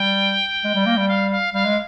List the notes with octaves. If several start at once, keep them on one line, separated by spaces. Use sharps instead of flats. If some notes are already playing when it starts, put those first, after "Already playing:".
Already playing: G3 G5
G#3
G3
A#3
G3
F5
F5
G3 F5
G#3